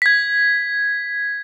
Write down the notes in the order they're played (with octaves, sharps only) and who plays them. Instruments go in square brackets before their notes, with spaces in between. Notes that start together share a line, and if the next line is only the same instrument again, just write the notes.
[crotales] G#6 B6